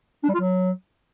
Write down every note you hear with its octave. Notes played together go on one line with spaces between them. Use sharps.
D4
G3
F4
F#3